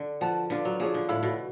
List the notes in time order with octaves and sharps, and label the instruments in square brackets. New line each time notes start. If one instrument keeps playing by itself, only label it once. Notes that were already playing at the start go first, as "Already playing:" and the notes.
Already playing: [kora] D3
[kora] F3 [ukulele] F#4 B4 F#5 A5
[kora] D3 [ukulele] D4 F4 B4
[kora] F#3
[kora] F3 [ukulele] D4 G#4 C#5
[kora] D3
[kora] A2 [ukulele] A4 F5 B5
[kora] B2